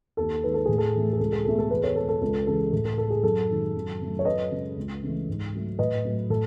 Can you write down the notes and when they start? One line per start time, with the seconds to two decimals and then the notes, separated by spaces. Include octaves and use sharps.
0.17 D#2 A4
0.44 D#3 G#3 B4
0.54 A4
0.65 A2 G#4
0.78 A4
0.94 E3 A3
1.13 G#4
1.19 C#2 A4
1.32 G#4
1.45 B2 A3 A4
1.58 A4
1.70 E2 G#4 B4
1.83 A4 C#5
1.96 B2 G#3 A4
2.09 A4
2.21 C#2 A4
2.47 C#3 E3 G#3 A4
2.73 A2 A4
2.85 A4
2.98 G#3 A4
3.10 G#4
3.23 F#2 A4
3.49 D#3 G#3
3.75 F#2
4.00 C#3 F#3 A3
4.19 C#5
4.25 F#2 B4 D#5
4.51 C#3 G#3
4.77 C#2
5.03 C#3 E3 A3
5.28 G#2
5.54 F#3 A3
5.79 A2 B4 D#5
6.05 F#3 A3
6.30 A2 A4